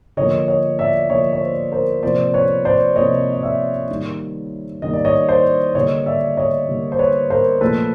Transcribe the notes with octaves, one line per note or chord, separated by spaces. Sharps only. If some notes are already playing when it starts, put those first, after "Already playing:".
D3 F3 A#3 C#5 D#5
C#5 D#5
D5 E5
D3 F3 A#3 C#5 D#5
C#5
C5 D5
A#4 C5
C3 F3 A#3 C5 D5
B4 C#5
C5 D5
C3 F3 A#3 C#5 D#5
D#5
D5 E5
D#3 G3 A#3
D#3 G3 A#3 D#5
D5
C#5 D#5
C5 D5
D3 G3 A#3 C#5 D#5
D5 E5
C#5 D#5
D3 G3 A#3
C5
B4 C#5
A#4 C5
A#2 F3 A3 A4 B4